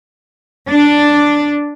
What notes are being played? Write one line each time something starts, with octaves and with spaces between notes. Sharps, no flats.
D4